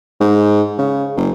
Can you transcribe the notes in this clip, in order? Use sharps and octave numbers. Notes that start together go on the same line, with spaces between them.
G#2
C#3
F#1